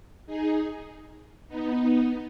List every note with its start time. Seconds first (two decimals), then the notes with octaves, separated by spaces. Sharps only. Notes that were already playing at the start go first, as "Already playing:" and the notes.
0.27 D#4 G#4
1.49 B3 D#4